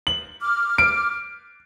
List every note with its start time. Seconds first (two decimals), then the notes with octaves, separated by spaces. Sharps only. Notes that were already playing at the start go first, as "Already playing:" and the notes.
0.07 F#7
0.41 D6 F6
0.78 D7